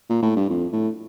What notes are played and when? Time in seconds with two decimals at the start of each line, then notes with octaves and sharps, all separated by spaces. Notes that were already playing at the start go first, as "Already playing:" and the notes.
0.10 A#2
0.22 A2
0.36 G2
0.50 F2
0.73 A2